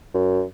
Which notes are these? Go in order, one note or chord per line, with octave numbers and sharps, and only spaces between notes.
F#2